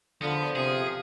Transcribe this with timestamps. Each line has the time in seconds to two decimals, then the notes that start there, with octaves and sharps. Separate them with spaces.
0.22 E2 D3 F3 B3
0.56 C3 G#4